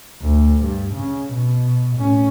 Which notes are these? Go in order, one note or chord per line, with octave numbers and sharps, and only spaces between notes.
D2
G2
C#3
B2
A2 C#4